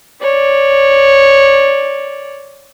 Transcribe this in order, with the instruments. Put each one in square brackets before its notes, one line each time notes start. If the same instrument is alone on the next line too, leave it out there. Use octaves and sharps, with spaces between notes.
[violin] C#5 D5